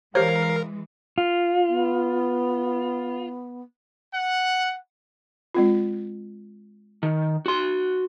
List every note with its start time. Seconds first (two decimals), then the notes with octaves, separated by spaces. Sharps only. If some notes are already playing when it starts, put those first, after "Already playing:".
0.15 E3 G#3 G4 A#4 C5 C#5 F5
1.18 F4
1.68 B3
4.13 F#5
5.54 G#3 C4 F4
7.03 D#3
7.46 F#4 C6